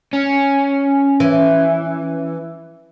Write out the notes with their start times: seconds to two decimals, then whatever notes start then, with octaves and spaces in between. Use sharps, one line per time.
0.13 C#4
1.20 E3